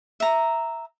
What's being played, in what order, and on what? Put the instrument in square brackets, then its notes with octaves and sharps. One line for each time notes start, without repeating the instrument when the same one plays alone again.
[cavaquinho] E5 A#5